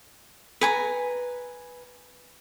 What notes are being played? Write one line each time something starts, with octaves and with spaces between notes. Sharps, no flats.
B4 G#5 A#5